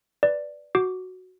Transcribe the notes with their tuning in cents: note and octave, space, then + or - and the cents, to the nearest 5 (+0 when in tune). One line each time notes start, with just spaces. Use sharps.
B4 +0 D5 +0
F#4 +0 D6 +0